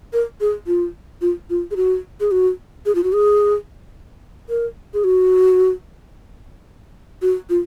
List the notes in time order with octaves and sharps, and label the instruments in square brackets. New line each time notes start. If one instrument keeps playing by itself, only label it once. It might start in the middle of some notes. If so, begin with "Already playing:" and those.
[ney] A#4
G#4
F4
F4
F4
G#4
F#4
G#4
F#4
G#4
F4
F#4
G#4
A#4
G#4
F#4
F#4
F4